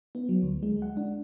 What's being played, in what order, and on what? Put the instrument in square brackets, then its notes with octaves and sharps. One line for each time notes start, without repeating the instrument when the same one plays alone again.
[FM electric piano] B3
F#3
D2
G#3
F#5
D4